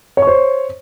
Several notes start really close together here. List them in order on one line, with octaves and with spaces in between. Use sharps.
C#5 C#6 C5